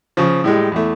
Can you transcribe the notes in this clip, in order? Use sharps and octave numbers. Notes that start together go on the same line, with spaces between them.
C#3 F3
A2 G3 G#3
E2 A3